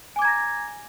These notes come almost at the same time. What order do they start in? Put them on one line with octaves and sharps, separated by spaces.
G#5 D6 G#6 A#5 A#6